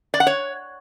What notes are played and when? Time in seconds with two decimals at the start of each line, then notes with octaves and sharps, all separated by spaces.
0.14 D5
0.20 F#5
0.27 C#5